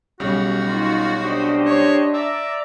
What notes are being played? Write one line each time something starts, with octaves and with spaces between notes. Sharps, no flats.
B1 C#3 G3 F#4
D#4 F4
D4 G4 C5 D#5
C#5
D5 E5 A#5 D6